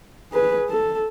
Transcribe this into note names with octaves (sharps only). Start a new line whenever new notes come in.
G#4 B4
A4